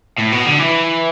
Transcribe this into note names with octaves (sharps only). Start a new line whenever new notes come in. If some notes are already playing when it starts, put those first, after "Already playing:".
A2
B2
D3
E3